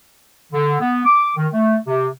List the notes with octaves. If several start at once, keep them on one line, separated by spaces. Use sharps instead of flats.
D3
B3
D6
D#3
A3
C3